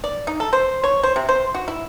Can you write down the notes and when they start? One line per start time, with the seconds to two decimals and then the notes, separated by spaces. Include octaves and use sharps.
0.04 D5
0.27 D#4
0.40 A4
0.53 C5
0.84 C#5
1.03 C5
1.16 C3
1.29 C5
1.55 F#4
1.68 E4